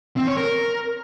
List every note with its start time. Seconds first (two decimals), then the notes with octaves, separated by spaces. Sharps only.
0.17 C4
0.27 C#5
0.37 A#4